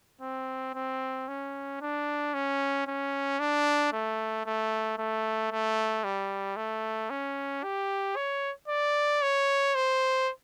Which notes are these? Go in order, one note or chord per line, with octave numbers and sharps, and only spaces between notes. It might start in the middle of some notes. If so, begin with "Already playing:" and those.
C4
C4
C#4
D4
C#4
C#4
D4
A3
A3
A3
A3
G3
A3
C#4
G4
C#5
D5
C#5
C5